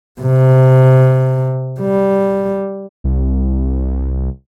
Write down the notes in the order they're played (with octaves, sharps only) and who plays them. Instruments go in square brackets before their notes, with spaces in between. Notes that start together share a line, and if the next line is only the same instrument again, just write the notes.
[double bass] C3
G3
[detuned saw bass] C2